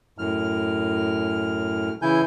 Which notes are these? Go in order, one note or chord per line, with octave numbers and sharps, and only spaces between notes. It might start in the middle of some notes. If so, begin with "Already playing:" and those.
F#2 A2 F6
C#3 E3 E4 G#5 G6